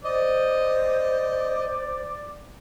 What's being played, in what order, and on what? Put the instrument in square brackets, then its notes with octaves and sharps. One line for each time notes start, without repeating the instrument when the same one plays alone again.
[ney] C5 [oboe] D5 [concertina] D#5